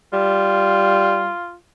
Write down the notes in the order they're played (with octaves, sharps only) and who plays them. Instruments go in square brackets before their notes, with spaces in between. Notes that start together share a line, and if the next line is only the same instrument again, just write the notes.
[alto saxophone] G3 [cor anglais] F4